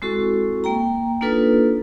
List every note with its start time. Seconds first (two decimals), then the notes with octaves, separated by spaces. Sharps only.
0.02 G#3 C4 E4 F#4 A4 C#6
0.64 A#3 G5 A#5
1.21 A#3 D4 D#4 F4 A4 B4